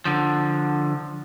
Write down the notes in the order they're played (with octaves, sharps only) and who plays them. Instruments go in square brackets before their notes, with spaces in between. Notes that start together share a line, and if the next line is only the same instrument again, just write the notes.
[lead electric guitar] D3 F3